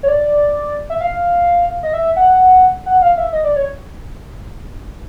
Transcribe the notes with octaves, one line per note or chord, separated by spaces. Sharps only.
C#5
D5
E5
F5
D#5
E5
F#5
F#5
F5
E5
D#5
D5
C#5